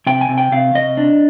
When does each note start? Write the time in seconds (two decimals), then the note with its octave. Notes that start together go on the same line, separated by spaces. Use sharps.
0.07 C3 G5
0.21 G#5
0.29 C3
0.38 G5
0.52 C3 F5
0.74 C3 D#5
0.97 D4